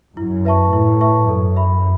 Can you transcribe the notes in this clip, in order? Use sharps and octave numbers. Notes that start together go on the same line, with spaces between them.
F#2 E4
B4 E5 A5 C#6
A2 E4
B4 E5 A5 C#6
F#2 A4
E5 B5